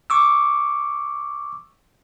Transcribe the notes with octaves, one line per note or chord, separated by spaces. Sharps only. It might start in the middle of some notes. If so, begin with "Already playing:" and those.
C#6 D6 E6